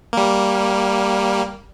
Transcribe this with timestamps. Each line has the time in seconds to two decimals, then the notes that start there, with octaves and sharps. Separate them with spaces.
0.13 G3 A#3